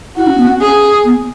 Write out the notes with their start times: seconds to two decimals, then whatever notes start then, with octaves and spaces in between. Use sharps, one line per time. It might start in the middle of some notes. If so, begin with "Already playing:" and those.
0.16 E4 F#4
0.27 C#4
0.37 B3
0.47 C#4
0.61 G#4
1.05 B3